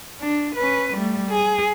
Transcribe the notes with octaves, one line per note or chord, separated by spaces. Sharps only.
D4
C#4 B4
G3 A3
G#4